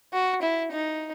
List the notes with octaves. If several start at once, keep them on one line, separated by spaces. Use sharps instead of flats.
F#4
E4
D#4